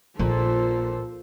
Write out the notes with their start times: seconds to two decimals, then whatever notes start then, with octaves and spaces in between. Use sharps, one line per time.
0.19 A#1 A#2 A4 C5